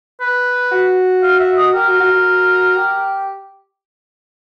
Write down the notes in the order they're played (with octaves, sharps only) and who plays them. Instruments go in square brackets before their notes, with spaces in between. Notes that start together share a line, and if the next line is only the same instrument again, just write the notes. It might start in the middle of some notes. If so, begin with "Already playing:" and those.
[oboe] B4
[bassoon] F#4
[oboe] F5
E5
D#5
[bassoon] G4 [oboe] A#4
[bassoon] F#4
F#4
F#4
G4